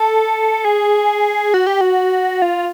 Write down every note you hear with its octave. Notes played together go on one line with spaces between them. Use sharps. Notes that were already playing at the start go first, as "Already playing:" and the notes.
Already playing: A4
G#4
F#4
G4
F#4
F4